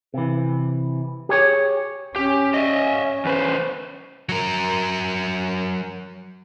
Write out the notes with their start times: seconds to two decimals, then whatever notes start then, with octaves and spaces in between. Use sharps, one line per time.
0.14 C3 E3
1.29 G4 G#4 C#5
2.16 C#4 G4
2.54 D#5 E5
3.25 E2 B4 C5
4.29 F#3 A#4